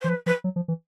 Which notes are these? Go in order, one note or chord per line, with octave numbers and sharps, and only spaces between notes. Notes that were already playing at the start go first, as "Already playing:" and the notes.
C5
E3
F3 B4
F3 B4
F#3
F3
E3